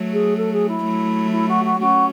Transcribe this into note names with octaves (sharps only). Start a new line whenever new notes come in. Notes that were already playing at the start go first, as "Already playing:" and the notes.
Already playing: F#3 A3
G#4
A4
G#4
E4
F#3 A3
E4
F#4
F#4
A3 C#4 F#4